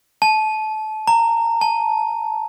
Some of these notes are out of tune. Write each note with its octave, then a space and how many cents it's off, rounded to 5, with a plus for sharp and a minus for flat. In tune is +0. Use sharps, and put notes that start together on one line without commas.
A5 -25
A#5 -20
A5 -20